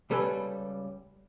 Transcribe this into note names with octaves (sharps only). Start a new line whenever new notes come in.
C#2 G3 A4 B4 G#5